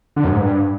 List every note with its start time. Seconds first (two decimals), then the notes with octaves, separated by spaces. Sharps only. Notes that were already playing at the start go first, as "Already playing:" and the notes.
0.16 D3
0.24 F#2
0.32 G#2
0.41 G2